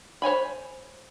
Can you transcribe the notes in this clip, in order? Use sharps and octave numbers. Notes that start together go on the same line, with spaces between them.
C5 C#5 G#5 B5